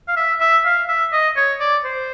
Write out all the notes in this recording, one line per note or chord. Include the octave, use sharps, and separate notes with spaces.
F5
E5
E5
F5
E5
D#5
C#5
D5
C5